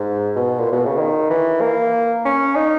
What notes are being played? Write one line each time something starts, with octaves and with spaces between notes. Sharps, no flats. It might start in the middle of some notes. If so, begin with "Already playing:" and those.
Already playing: G#2
B2
A#2
B2
C#3
D#3
E3
A#3
C#4
D#4